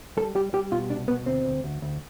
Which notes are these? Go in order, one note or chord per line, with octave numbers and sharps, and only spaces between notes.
G3 A4
G3 G4
G3 G4
B2 F4
C2 D4
B2 B3
D2 C4
D2
D2
D2